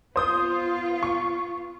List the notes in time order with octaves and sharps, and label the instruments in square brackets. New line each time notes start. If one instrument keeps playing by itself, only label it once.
[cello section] B3 F4 [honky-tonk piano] C5 D#6 G6
[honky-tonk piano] C#6